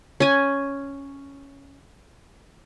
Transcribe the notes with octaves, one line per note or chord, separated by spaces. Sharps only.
C#4 G#5